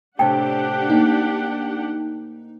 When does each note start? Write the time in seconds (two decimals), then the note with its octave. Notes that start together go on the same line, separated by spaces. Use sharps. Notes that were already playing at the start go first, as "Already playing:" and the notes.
0.19 A2 C3 D4 G4 F#5 G5 A5
0.90 A#3 D#4